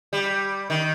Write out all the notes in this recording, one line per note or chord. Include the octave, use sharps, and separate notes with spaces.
G3
D#3